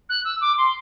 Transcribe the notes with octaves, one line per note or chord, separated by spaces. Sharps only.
F#6
E6
D6
C6